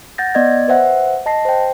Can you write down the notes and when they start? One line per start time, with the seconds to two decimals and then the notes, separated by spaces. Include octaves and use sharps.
0.18 F#5 G6 A6 A#6
0.34 B3 D5 D#5 G#6 A6
0.68 B4 C5 E5 F#5
1.26 D#5 A5 A#6 C7
1.45 C5 G5